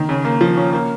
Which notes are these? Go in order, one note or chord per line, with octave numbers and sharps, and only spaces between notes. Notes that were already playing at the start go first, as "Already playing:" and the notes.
Already playing: D#3
C#3
A#3
F3
C#4
A#3